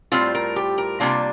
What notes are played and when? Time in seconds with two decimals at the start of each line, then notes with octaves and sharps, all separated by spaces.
0.12 A2 G3 C4 F4 C5
0.35 A#4
0.56 G4
0.78 A#4
1.00 C3 G3 A#3 D4 F4